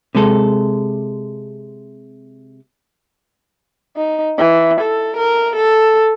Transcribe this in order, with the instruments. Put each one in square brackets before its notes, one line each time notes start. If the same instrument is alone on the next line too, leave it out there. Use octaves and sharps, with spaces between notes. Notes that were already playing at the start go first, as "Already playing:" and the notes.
[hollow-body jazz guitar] C3 G#3 A4
[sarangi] D#4
E3
A4
A#4
A4